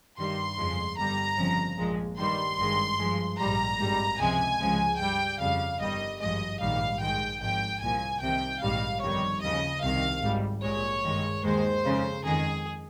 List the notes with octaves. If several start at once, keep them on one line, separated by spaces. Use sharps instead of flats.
G2 D#3 G3 C6
F2 C#3 F3 G#3
G1 G2 G3 A#5
G1 F2 C#3 F3
A#1 A#2 F3 G#3
G2 D#3 G3 C6
G#1 G2 D#3 G#3
G2 F3 G#3
A#1 G#2 G3 A#5
G#1 G2 G3
C#2 C3 F3 G#3 G#5
C#2 C#3 F3 G#3
G2 G3 G5
F2 C#3 G3 F5
G1 G2 D#3 G3 D#5
G#1 G2 F3 G#3 D#5
A#1 G#2 D#3 G3 F5
A#1 G#2 D#3 G#3 G5
G#1 G#2 F3 G5
C2 A#2 F3 G#5
C2 C3 D#3 G5
A#1 G#2 D#3 G3 F5
G1 F2 D#3 G3 C#5
D#2 C#3 F3 D#5
C2 C3 D#3 F5
G#1 G#2 G3
A#1 A#2 G#3 C#5
G2 D#3 G#3
D#2 D#3 G#3 C5
F2 C#3 G#3
F2 D#3 G#3 G#4